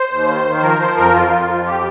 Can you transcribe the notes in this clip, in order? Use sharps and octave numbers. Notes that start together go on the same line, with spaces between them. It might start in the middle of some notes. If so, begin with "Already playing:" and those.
Already playing: C5
D#2
D#3
D#3
C5
F3 A#4
F3 C5
F2 A#4
F2 F4
F3
F2
G4